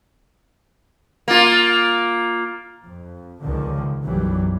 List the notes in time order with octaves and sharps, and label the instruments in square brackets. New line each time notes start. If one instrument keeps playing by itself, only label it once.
[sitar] A#3 F4
[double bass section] F2
C#2 D3 D#3 F3
B1 F#2 B2 E3 F#3 G3